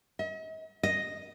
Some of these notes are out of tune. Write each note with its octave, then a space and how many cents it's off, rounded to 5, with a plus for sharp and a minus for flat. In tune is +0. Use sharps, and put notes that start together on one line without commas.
D#5 +45
D#5 +0